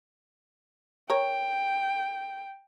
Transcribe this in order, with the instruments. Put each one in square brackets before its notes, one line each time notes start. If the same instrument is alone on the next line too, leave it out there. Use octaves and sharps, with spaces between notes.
[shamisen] A#4 C#5 [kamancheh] G5